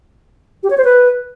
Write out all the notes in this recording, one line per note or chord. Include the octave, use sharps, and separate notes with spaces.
G4
C#5
C5
B4